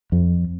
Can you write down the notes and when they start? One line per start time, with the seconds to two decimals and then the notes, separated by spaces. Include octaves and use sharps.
0.12 F2